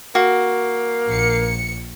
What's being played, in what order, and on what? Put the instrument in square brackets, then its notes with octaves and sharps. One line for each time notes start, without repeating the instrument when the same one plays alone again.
[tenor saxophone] A#3 [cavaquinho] F#4
[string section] A#1 C#7